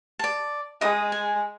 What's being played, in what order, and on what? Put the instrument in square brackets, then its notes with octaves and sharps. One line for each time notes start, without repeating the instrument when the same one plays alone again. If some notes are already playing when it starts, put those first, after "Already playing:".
[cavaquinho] D5 A5
[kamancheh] G#3 [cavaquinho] D#5 D#6
[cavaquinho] G#5